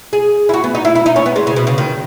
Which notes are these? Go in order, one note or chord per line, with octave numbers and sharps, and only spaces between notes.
G#4
E4
F#4
B3
D#4
E4
E4
D#4
C#4
B3
G#3
C#3
B2
C#3
D#3